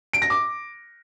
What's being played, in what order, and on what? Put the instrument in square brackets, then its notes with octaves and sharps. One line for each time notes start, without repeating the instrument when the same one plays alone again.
[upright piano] D7
A#6
D6